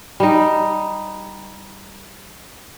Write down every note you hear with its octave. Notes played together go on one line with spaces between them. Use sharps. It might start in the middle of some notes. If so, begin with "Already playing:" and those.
G3 D#4